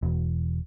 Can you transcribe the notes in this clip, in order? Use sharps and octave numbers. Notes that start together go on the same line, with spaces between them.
E1